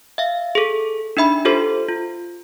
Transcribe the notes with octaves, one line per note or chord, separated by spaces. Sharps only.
E5 F5
G#4 A4
D4 D#4 E5 B5
F4 G4 A4 C5
F4